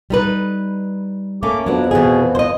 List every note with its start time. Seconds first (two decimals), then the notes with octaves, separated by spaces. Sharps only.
0.10 G3 D#4 B4
1.43 A3 A#3 C#4 D6
1.66 F2 F3 F#3 B3 D4
1.91 B2 E3 G#4
2.35 C5 D#5